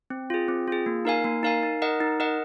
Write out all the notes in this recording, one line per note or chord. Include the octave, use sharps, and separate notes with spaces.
C4
F4 G#4
C4
F4 G#4
A#3
D#4 A#4 F5 G#5
A#3
D#4 A#4 F5 G#5
D#4
A#4 D#5 F#5
D#4
A#4 D#5 F#5